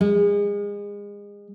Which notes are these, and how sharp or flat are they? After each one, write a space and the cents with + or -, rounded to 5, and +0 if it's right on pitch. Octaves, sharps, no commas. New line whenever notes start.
G#3 -30